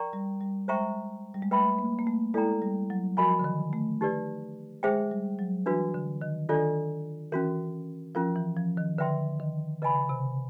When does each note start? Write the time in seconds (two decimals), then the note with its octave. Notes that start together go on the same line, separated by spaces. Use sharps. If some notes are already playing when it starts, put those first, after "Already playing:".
Already playing: A#4 D5 G5 A#5 C#6
0.13 G3
0.41 G3
0.68 G#3 C5 E5 G5 A#5 C#6
1.34 G3
1.43 G#3
1.51 A3 B4 E5 G5 B5
1.79 A#3
1.99 A#3
2.07 A3
2.34 G#3 E4 A4 D5 G5 A#5
2.62 G3
2.90 F#3
3.17 F3 F#4 A#4 D#5 G#5 B5
3.39 D3
3.44 D#3
3.73 A3
4.01 D#4 G4 B4 D5
4.83 G#3 G#4 C5 E5 G5
5.11 G3
5.39 F#3
5.66 E3 D4 F#4 B4
5.94 D3
6.22 D#3
6.49 D#3 D4 F4 A4 D5
7.32 E3 C#4 F#4 A#4
8.15 F3 C#4 F4 A#4
8.36 E3
8.57 F3
8.77 D#3
8.98 D3 B4 E5 G5 C6
9.40 D#3
9.82 C#3 B4 D#5 G#5 B5
10.09 C3